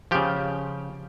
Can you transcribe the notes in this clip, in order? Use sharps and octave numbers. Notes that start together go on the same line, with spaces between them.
C#3 F3 G4